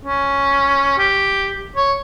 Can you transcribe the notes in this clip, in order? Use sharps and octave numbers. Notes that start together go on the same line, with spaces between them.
C#4
G4
C#5